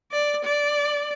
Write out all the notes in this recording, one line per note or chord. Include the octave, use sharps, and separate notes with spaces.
D5
D5